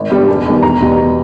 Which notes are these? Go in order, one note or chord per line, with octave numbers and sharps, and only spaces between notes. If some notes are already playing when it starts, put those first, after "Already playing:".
Already playing: G#1
G2 G3
E1
E2 D#3 G3
E1 A#5
E2 B2 G3